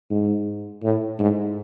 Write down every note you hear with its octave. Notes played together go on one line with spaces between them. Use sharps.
G#2
A2
G#2